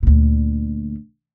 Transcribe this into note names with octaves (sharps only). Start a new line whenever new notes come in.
D2 A#2